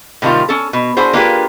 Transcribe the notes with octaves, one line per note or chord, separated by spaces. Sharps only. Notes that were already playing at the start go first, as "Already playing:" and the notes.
A2 C3 D#3 G3 F4
C#4 A4
B2
D4 E4 F#4 G#4 C5
A#3 D4 F4 G4 G#4 B4